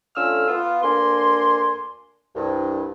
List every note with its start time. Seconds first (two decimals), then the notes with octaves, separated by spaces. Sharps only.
0.16 D3 A3 C#4 F4 E6 F6
0.48 B3 F4
0.82 D2 A#3 D4 G#5 C6
2.35 C2 G2